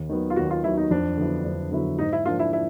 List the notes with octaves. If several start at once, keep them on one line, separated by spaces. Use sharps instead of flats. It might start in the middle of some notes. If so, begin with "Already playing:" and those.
Already playing: D#2
D#3 F#3 B3
F4
D#2 F#4
F4
D#3 F#3 B3 E4
D#4
F2 D4
D3 F#3 B3 E4
F2
D3 F#3 B3 E4
G#2 D#4
E4
F3 A#3 D4 F4
E4
E4